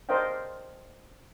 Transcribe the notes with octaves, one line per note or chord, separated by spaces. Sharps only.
A#4 C5 D5 D#5 F5 G5